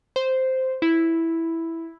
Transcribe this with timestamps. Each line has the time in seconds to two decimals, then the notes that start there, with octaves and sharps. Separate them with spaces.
0.16 C5
0.82 E4